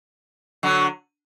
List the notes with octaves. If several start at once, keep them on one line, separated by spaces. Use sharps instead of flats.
D3 F#3